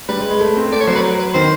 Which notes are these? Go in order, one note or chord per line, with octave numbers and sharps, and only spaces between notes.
G3 B4
G#3
G#3
A3
C4
A3 D5
C#5
F#3 C5
B4
A#4
B4
D#3 C5